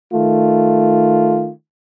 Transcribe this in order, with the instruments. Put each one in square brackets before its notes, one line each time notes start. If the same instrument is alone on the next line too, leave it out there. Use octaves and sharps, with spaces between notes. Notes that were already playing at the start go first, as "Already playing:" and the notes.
[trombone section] D#3 A3 F4